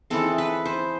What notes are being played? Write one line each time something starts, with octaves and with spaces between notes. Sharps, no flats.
E3 G#3 C4 A4
B4
C5